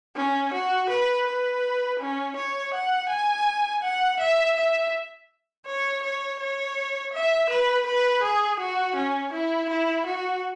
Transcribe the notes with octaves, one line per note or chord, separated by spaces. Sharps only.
C#4
F#4
B4
B4
C#4
C#5
F#5
G#5
F#5
E5
E5
C#5
C#5
C#5
E5
B4
B4
G#4
F#4
C#4
E4
E4
F#4